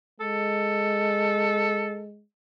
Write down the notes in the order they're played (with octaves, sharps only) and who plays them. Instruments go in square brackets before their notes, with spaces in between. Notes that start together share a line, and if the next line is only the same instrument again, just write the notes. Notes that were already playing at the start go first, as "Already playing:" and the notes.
[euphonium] G#3 [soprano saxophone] A4